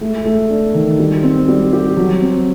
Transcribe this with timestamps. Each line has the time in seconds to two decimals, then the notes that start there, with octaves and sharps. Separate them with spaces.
0.01 A3
0.25 A3
0.50 D4
0.74 D#3
0.99 G3
1.23 C4
1.48 G3
1.73 G4
1.97 F#3
2.22 C4